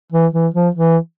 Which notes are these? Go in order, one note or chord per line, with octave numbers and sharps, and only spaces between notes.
E3
E3
F3
E3